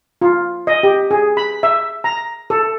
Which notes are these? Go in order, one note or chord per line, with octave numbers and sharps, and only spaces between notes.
F4
D#5
G4
G#4
B5
E5
A#5
A4